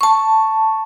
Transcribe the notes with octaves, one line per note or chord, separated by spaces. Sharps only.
A5 C#6